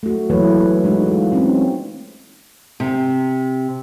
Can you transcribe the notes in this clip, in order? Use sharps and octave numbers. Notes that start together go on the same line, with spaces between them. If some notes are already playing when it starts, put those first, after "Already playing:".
A3 F#4
E3 F#3 A3 A#3 B4 C#5
A#3
G#3 D#4 F#4
F4
C4 C#4 D#4
C3